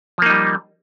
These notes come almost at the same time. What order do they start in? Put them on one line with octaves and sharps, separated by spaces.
F3 A#3 D#4 G3